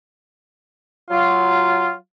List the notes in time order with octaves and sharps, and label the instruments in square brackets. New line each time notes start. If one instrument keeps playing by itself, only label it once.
[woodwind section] F#3 F4